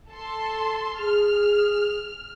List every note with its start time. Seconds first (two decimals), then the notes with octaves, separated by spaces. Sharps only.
0.10 A4 A5 C6
0.99 G#4 F6